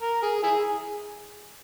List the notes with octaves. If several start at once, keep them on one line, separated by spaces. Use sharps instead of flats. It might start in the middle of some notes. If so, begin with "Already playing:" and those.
A#4
G#4
E4 G#4